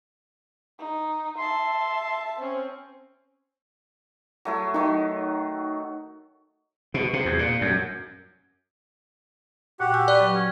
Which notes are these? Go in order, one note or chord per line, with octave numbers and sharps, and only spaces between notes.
D#4
E5 A5 C6
C4 C#4 C5
F#3 A3 E4
D#3 F#3 D#4
B2
C3
E2
A#2
F#2
A#2 F#4 G4 F#5
G#5 E6 G6
B4 D5
F#3
C#4